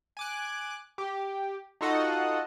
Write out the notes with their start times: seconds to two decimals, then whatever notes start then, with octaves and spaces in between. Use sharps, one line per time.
0.17 G#5 D6 F#6
0.98 G4
1.81 D#4 F4 F#4 A4 D#5 F#5